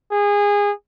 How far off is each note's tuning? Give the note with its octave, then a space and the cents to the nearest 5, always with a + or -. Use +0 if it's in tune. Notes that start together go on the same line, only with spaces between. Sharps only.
G#4 -25